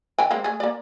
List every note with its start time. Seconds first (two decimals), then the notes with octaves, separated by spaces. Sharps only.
0.18 D#3 G5 G#5
0.31 G#3 A#3 C4
0.44 A3 G#4
0.60 A#3 D5